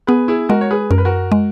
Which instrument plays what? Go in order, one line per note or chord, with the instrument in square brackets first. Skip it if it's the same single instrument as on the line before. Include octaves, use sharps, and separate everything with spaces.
[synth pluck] B3 [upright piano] G#4 B4
[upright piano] E4 G#4
[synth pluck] G#3 [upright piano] F#4 A#4
[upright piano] C#5
G#4 B4
[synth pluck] F#2 [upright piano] A#4
[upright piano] B4
F#4 A#4
[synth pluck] G#3